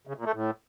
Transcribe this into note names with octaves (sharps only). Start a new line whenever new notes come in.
C#3
A#2
A3
A2